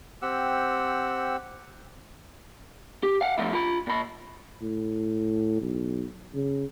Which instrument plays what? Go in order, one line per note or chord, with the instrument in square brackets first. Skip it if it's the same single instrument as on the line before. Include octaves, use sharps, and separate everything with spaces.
[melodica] C4 G4 F#5 E6
[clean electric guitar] G4
F5 F#5
D3 F3 A3 E4
F4 B5
A#2 B5
[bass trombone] A2
B1
C#3